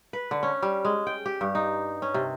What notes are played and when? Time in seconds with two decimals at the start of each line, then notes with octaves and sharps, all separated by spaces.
0.13 B4
0.31 D3
0.43 C#4
0.62 G3
0.85 G#3
1.07 G5
1.26 G4
1.41 G2
1.55 D#4
2.02 C#4
2.14 C3